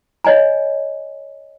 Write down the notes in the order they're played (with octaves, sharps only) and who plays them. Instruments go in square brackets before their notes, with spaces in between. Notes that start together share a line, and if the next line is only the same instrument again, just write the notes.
[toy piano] C#5 D#5 G#5 A#5